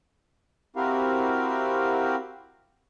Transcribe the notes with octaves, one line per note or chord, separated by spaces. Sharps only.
C4 E4 F#4 G4 A#4 F5